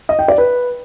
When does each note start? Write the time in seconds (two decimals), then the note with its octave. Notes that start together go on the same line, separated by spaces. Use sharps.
0.09 D#5
0.19 G5
0.28 D5
0.38 B4